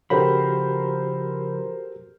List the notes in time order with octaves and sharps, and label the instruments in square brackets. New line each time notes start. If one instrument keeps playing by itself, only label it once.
[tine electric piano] C#3 B5 [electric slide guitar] F3 [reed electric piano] F#4 G4 [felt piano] A4 A#4 C5